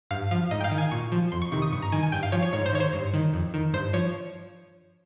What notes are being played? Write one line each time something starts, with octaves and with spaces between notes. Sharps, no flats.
G2 F5
F3 F5
G#2 D#5
G5
F5
D#3
G#5
A#2 C#6
F3
F2 C6
C#6
C3 D#3 C#6
D#6
G2 C#6
A#5
D#3 G#5
G#5
G2 G5
F5
F3 C#5
C#5
G#2 C#5
C5
D#3 C#5
C5
G2
D#3
F2
D#3
G2 C5
F3 C#5